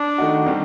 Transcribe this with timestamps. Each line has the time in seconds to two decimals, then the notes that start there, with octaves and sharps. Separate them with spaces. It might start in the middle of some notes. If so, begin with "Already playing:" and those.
Already playing: D4
0.18 D#3 A3 D#4 F#4
0.46 D#3 G3 C4 G4